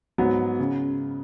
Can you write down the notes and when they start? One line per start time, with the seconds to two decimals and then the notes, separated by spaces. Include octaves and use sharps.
0.18 G#2 F#3 B3
0.59 C#3